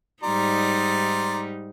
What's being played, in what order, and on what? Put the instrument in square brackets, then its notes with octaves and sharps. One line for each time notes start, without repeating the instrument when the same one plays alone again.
[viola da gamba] G#2 G3 D#4 [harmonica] D5 A#5 C6